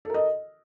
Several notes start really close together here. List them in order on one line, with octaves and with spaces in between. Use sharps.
A4 A#4 D#5